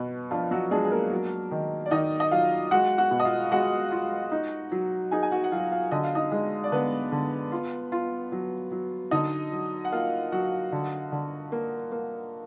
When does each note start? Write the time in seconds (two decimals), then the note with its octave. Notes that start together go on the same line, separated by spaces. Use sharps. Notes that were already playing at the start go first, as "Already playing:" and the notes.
Already playing: B2 B3 B4
0.31 F3 D4 F4
0.51 F#3 F#4
0.71 G#3 D4 G#4
0.85 G#4
0.91 A#3 A#4
1.12 F#3
1.51 D#3
1.86 D5
1.91 D#3 D#4 D#5
2.20 D#5
2.31 F#3 F4 F5
2.71 G#3 F#4 F#5
2.98 F#4 F#5
3.11 B2
3.20 D#5
3.25 F4 F5
3.52 G#3 F#4 F#5
3.92 F4
4.32 D#4
4.72 F#3
5.11 D#4 G#4 G#5
5.23 G#5
5.31 F#4 F#5
5.44 F#5
5.52 F#3 F4 F5
5.71 F4 F5
5.91 D3 D#5
6.04 F5
6.15 D#4 D#5
6.31 G#3
6.64 D5
6.72 D3 B3 B4
7.12 D3
7.52 F4
7.92 F4
8.32 F#3
8.72 F#3
9.11 D3 D#4 D#5
9.52 F#3
9.85 F#5
9.92 A#3 F4 F5
10.32 F#3 F#4 F#5
10.72 D3
11.12 D3
11.52 A#3
11.92 A#3